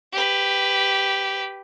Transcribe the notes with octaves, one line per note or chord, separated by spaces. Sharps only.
G4 B4